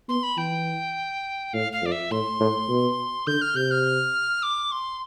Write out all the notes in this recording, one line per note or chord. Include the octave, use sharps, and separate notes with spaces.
B3 C6
B5
E3 G5
A2 F5
F5
F2 D5
E5
A2 C6
A2
B2
D3 G6
F6
C3 G6
F6
D6
C6